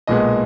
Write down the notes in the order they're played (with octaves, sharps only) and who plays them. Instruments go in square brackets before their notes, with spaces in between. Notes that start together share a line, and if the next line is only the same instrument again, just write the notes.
[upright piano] B1 A#2 G#3 B3 D#5